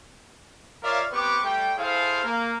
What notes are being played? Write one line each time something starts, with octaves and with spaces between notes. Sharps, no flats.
F4 A#4 C#5 D5 E5 F5
B3 C4 G4 B4 C#6 D6
G3 A3 G5
E4 G#4 A4 C5 F5
A#3